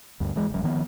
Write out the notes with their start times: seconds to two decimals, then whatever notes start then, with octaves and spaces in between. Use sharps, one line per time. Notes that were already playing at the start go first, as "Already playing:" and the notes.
0.20 D2 G2
0.36 E3 G#3
0.50 F#1 F#2
0.64 D#3 F3 B3